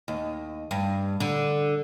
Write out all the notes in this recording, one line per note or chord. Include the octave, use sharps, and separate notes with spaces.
D#2
G2
D3